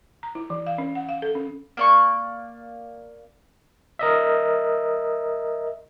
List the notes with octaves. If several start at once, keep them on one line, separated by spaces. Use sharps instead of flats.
A#5
E4
E3
F5
C#4
F#5
F5
A4
C#4
A#3 D5 C#6
A#4 D#5 E5